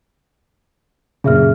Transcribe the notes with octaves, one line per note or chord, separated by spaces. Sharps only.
F#2 A#2 C#3 G#4 E5 F6